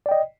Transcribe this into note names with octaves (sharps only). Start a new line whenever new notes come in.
D5 D#5 G5